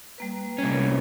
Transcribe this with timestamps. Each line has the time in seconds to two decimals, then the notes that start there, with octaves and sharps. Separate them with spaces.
0.18 G3 A#3 B4
0.58 C2 C#4